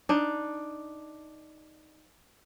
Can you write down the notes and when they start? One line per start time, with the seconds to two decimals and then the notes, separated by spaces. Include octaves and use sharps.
0.09 D4 D#4